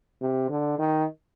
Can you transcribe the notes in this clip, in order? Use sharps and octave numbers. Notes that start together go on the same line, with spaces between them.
C3
D3
D#3